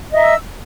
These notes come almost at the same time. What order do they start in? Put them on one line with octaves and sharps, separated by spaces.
D#5 E5 A#5 E6